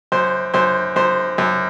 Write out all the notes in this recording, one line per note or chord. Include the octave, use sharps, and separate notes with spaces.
F#2 C5
F#2 C5
F#2 C5
F#2